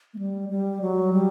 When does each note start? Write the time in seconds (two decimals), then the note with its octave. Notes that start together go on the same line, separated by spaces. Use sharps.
0.14 A3
0.19 G3
0.49 G3
0.81 F#3
1.13 G3